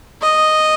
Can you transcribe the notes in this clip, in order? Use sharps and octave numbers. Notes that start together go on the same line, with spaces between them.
D#5